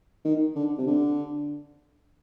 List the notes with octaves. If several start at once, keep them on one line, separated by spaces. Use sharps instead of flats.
D#3
D3
C3
D3